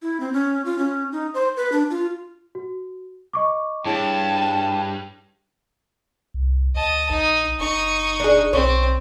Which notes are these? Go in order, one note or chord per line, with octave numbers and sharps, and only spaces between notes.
E4
C4
C#4
F4
C#4
D#4
C5
B4
D4
F4
F#4
D#5 C#6 D6
G2 E4 G#4 C#5 G5 A5
C2
D2 D#5 A5
A#1 D#4
F#1 D#4 C#6
D4 G#4
B1 C4 C#5